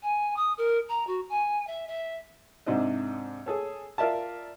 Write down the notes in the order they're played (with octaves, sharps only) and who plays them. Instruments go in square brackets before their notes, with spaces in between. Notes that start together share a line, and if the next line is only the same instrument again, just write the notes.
[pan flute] G#5
D#6
A#4
A#5
F#4
G#5
E5
E5
[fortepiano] G#2 C3 C4 D4 D#5
G#4 A4 C#5
F4 A#4 D5 E5 A5